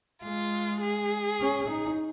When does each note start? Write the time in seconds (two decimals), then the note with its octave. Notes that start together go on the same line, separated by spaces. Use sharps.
0.23 G#3 F4
0.81 G#4
1.40 C#4
1.68 D#4